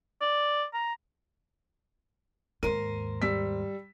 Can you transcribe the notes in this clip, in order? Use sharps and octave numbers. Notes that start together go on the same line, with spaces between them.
D5
A#5
D#2 G#2 A#4 C5 D#7
G3 E6 B6